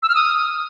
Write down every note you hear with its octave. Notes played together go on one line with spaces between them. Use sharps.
E6
F6
D#6